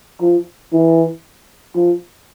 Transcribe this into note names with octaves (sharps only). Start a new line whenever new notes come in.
F3
E3
F3